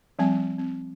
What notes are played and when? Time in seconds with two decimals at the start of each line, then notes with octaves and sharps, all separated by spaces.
0.19 F3 G3 C4 G#5
0.59 C4